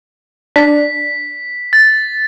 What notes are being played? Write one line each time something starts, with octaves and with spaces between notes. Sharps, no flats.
D4 B6
A6